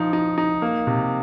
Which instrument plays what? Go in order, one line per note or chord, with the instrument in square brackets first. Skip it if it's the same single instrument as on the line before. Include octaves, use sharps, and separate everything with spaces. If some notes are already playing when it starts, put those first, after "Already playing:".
Already playing: [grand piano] F3 D#4
D#4
D#4
A#3
C3